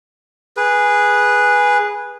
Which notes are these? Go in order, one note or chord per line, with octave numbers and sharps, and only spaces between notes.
G#4 B4